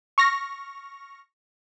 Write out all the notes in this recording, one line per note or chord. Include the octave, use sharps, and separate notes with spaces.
C#6 F6 A#6